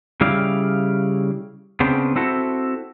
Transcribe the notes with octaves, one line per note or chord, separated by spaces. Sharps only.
C#3 G3 E4 D5 F5
C#3 B3 C4 D4
C4 E4 F#4 A4